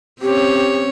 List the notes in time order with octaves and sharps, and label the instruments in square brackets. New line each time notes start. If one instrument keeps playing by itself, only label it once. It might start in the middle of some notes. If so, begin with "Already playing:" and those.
[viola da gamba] C4 C#4 C#5 [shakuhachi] G4